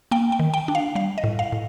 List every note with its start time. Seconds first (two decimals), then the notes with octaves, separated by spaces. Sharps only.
0.11 A#3 G5
0.32 G5
0.39 D#3
0.54 G5
0.68 D4
0.75 F5
0.95 G3 F5
1.18 D#5
1.24 A2
1.39 F5
1.52 A2